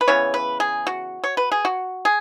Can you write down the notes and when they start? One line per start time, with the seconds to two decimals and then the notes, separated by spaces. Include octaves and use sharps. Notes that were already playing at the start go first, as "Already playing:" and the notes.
0.01 B4
0.08 C#3 E3 B3 C#5
0.34 B4
0.60 G#4
0.87 F#4
1.24 C#5
1.37 B4
1.52 G#4
1.65 F#4
2.05 G#4